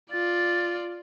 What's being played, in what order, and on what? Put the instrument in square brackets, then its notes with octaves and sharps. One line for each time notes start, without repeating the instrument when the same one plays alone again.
[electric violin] F4 D5 [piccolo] A6